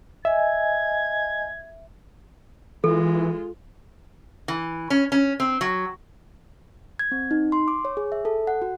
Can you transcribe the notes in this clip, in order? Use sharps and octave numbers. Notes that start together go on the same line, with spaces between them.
D#5 E5 G#5 G#6
E3 G#3 F4 A4
E3
C#4
C#4
C4
F#3
G#6
C4
D#4
C6
D6
C#5
G#4
E5
A4
F#5
F#4